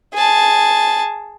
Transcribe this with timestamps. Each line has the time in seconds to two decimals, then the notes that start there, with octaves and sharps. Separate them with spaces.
0.15 G#4 A5